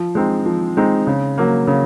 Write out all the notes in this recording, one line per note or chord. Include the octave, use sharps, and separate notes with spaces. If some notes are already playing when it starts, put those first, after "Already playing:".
Already playing: F3
G#3 C4 D#4
F3
G#3 C4 D#4
C#3
F#3 A#3
C#3